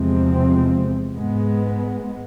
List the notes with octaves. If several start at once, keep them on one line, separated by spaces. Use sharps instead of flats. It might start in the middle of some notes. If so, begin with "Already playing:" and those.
Already playing: E2 C3 F3 G#3 C4
G#2 G#3 B3